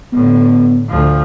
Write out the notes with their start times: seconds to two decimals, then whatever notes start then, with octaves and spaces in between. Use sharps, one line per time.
0.13 A2 D3 B3
0.88 D2 F3